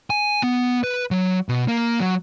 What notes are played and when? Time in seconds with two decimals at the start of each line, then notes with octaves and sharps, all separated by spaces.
0.10 G#5
0.43 B3
0.84 B4
1.11 F#3
1.49 B2
1.68 A#3
2.00 F#3